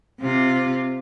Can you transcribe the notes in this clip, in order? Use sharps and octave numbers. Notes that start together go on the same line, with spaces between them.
C3 F4